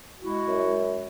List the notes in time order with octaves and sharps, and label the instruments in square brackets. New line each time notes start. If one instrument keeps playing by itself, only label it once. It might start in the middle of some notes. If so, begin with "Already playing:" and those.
[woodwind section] G#3 E4 F#4
F#2